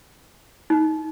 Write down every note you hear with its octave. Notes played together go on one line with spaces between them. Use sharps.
D#4